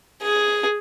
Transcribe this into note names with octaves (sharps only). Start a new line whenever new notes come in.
G#4